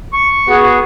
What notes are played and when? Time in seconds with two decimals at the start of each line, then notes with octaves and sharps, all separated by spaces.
0.13 C#6
0.48 B3 F#4 G#4